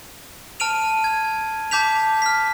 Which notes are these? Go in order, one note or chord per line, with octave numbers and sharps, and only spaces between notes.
A5 F6 D7 D#7 F7
G#6
A5 D6 G6 B6 F7
F6 B6